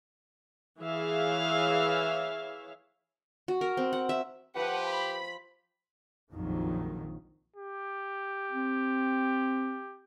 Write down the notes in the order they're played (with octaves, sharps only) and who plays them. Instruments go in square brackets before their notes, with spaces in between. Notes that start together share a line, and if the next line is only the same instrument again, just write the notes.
[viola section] E3 G#4 C#5 E5 F5
[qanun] F#4
A#4
C4
F#5
E5
[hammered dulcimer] F3 [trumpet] G4 [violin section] B4 F#5
[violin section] B5
[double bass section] A#1 F2 D#3 F#3
[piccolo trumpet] G4
[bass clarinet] C4